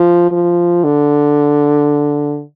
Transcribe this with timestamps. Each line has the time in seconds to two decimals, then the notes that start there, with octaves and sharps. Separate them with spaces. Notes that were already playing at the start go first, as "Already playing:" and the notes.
Already playing: F3
0.31 F3
0.84 D3